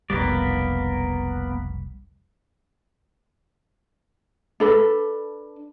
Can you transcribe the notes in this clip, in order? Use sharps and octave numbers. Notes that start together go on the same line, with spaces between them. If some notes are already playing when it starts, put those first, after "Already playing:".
F1 B1 G3 A#3 B3 D5
D4 A4 B4